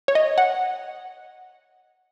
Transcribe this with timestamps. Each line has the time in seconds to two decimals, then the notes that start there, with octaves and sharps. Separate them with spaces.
0.08 C#5
0.15 D#5
0.38 F#5